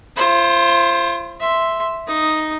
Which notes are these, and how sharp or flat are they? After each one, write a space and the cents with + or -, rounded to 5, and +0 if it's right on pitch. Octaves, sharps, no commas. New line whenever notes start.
F4 -40 C5 +20
E5 +0 C6 +0
D#4 +0 D#6 +0